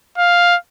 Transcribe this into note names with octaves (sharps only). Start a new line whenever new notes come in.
F5